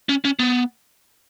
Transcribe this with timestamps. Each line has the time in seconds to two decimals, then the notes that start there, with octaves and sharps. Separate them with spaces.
0.09 C#4
0.25 C#4
0.39 B3